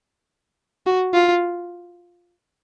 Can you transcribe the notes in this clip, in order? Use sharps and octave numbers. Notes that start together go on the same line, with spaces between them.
F#4
F4